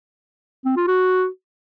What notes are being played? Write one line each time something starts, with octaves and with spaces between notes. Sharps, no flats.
C4
F4
F#4